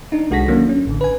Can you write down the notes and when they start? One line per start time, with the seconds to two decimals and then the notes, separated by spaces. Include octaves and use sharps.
0.12 D4 D#4
0.30 C2 G#3 F#4 A4 A#6 B6
0.48 D#3 F#3 A#3 C#4 D4
0.69 C#4
0.86 A1 D3
1.01 B4 G#5